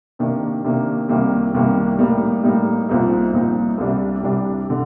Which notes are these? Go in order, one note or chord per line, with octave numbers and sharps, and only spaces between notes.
C3 D#3 A#3 D4
C3 D#3 A#3 D4
C2 C3 D#3 G3 A#3
C2 C3 D#3 G3 A#3
A2 G3 A#3 D#4
A2 G3 A#3 D#4
C2 A#2 F3 C4 D#4
C2 A#2 F3 C4 D#4
C2 C3 G3 D4
C2 C3 G3 D4
D3